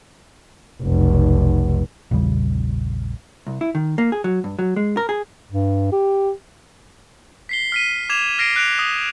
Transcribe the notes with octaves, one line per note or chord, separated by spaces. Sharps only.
F1 B1
A#1 E2 C#3 G3
C2
E4
D#3
A#3
G#4
F#3
G2
F#3
G#3
A#4
G#4
G2
G4
B6 C7 G7
F6 B6 D#7
D6 G#6 E7 F7
F6 A#6 C7 D7
F#6 D7 F7
D#6